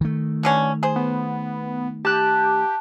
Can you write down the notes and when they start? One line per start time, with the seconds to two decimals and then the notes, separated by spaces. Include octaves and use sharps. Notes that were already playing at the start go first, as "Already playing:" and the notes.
0.01 D#3 A3
0.43 B2 D3 C#4
0.83 G#4 C5
0.96 B3
2.05 G4 A5 F#6